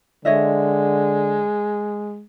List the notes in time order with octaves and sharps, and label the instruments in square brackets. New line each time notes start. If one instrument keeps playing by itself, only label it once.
[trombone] D3 [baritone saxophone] G#3 [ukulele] C#5 D#5 E5